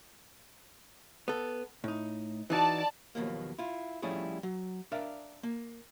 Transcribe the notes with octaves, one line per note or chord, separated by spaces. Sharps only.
B3 A4
A2 D#4
E3 D#4 F#4 D5 A5
D#2 B2 F3 F#3 A#3
E4 F4
F3 G3 A3 C#4 E4 G#4
F#3
D4 A#4 D5 E5 F5
A#3